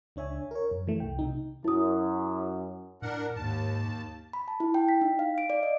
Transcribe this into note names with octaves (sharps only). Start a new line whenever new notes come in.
C#2 D4 C#5 E5 G#5
A#4 C#5
F#2
E3 A3
C2 G5
C3 D#4
F#2 E4 D#6
A2 D4 A#4 F#5
D#2 G#2 A5
B5
A5
E4
G5
B6
D#4
F5
D7
D5
D#5